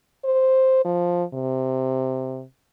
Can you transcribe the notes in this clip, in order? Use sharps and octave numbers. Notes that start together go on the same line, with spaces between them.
C5
F3
C3